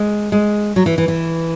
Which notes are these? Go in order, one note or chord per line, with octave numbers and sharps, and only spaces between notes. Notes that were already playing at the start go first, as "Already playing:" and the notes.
Already playing: G#3
G#3
F#3
E3
E3
E3